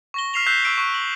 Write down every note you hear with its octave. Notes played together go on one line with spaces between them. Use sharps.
C#6 A#6 G7
F6 B6 C7 E7 F7 G7
E6 F#6 G6 B6 C7 E7
C#6 E6 D7
C#6 F#6
F#7